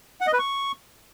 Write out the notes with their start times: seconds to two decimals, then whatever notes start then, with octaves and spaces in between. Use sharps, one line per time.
0.21 F#5
0.27 D#5
0.33 B4
0.39 C#6